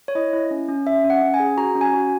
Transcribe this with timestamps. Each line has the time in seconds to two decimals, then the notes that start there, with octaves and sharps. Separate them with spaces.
0.08 C#5
0.15 E4 D#5
0.33 E4
0.51 C#4
0.69 C#4
0.86 C#4 E5
1.04 C#4
1.10 F#5
1.22 C#4
1.34 G#5
1.40 G#4
1.57 F#4 A#5
1.75 C#4
1.81 G#5
1.93 F#4